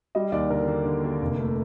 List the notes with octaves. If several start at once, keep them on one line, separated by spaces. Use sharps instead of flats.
G3 D#5
D#2 D5
D3 A#4
A#3
D3
A#3
F1
A3